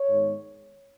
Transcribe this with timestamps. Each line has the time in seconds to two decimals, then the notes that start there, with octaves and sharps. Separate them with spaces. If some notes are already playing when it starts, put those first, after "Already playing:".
Already playing: C#5
0.09 G#2 D#3 G#3 B3